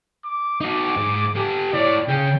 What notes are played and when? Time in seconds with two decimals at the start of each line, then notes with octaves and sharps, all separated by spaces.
0.25 D6
0.61 D#4 F#4 D6
0.96 G#2
1.35 G4 A4
1.73 E4 C#5 D5
2.08 C#3 G#4 G5